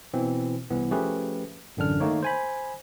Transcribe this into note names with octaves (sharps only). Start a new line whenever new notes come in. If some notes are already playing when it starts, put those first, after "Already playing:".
B2 E3 C4
C2 E3 B3
F3 A3 C#4 G4 G#4 B4
A1 F#2 D3 D4 F6
D#3 A3 A#3 D#4 C#5
C5 G#5 B5